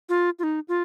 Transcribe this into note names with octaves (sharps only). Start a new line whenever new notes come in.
F4
F4
D#4
F4